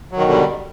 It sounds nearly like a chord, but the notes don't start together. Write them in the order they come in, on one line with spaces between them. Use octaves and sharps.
F#3 D#3 B2 D3 G3